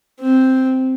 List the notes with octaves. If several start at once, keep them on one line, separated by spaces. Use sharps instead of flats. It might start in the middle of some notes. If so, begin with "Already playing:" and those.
C4